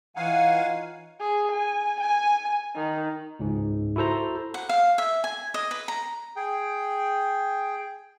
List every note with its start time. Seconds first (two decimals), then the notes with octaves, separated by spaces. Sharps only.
0.16 E3 D#4 F4 C#5 F5 F#5 G#5
1.20 G#4
1.52 G#5
2.00 G#5
2.76 D#3
3.39 C#2 G#2
3.96 E4 F#4 A4 C5 A#5
4.54 F#5
4.69 F5
4.98 E5
5.24 G#5
5.54 D#5
5.71 B4
5.88 A#5
6.36 G#4 G5